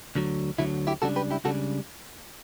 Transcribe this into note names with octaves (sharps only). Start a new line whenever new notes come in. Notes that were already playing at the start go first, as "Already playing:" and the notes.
D2 D3 F#3
D2 D3 F#3 E4
E4 G4
C#2 C#3 G3 D4 F#4 A4
G4 B4
E4 G4
C#2 C#3 G3 D4 F#4 A4